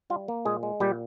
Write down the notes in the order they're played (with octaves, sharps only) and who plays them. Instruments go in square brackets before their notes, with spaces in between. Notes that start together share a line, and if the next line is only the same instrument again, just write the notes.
[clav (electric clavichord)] G3 F4
A#3
A#2 G#3 G#4
G#3
A#2 G3 G4